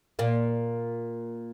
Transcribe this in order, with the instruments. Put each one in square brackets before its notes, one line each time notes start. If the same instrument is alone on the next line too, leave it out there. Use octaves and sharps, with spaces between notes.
[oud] A#2 A#3